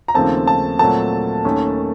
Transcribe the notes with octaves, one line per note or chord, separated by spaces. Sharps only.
A#5
D#2 C#3 F3 A3 C4 A5
A5
A#2 F#3 A3 C4 A5
D#2 D#3 A3 C#4